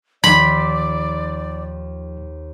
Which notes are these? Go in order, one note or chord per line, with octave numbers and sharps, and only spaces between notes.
D#2 F3 D5 B5 C6